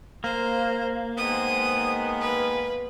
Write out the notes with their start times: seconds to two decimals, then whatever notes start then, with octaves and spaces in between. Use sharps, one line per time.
0.24 A#3 C5
1.18 D#3 G#3 B3 C5 D#6
2.21 B4